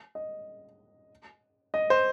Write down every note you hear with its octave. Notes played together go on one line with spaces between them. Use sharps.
D#5
D#5
C5